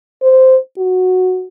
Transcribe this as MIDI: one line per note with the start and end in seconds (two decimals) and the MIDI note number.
0.22 0.57 72
0.78 1.46 66